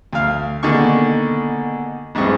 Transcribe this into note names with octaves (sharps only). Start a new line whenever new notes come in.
D2 F5
B2 D3 D#3 A#3 G#4 C#6
A1 G2 G#3 C4 C#6